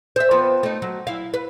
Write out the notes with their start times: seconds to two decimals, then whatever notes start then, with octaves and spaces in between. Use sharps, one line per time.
0.16 C5 E5
0.31 F3 B3 C4
0.63 A3 D#4
0.82 F#3
1.07 E4 F5
1.34 B4